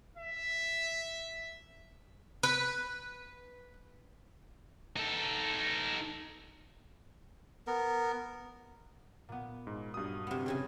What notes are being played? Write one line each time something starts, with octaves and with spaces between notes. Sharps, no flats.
E5
B4
D#4 A4
B3 A#4
A#2 B3
G#2
G2 F#3 D#6
C3 B3
E2 C#3 G5 G#5